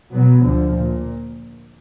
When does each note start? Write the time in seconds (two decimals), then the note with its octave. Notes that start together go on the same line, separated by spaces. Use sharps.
0.12 B2 F#3 B3
0.44 D2 D3 F3
0.75 A#2